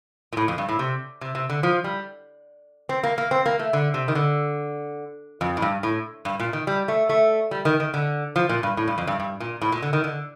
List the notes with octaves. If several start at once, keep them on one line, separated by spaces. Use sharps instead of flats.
A#2
A2
F2
G2
A2
C3
C3
C3
D3
F3
G3
C4
A#3
A#3
C4
A#3
A3
D3
C3
D#3
D3
F2
A2
G2
A2
G2
A#2
D#3
G3
A3
A3
G3
D#3
D#3
D3
F3
A#2
G2
A2
G2
F2
G2
G2
A#2
A2
A#2
D3
D#3
D3